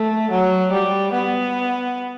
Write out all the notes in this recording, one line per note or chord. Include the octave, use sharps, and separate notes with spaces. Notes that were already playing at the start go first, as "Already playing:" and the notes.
Already playing: A3
F#3
G3
B3